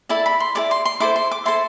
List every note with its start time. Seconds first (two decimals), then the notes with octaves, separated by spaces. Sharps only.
0.09 E4 A4 D5 A5
0.26 B5
0.40 C6
0.55 E4 A4 D5 D6
0.71 C6
0.85 C6
1.00 E4 A4 C5 D6
1.16 C6
1.31 D6
1.45 E4 A4 C5 C6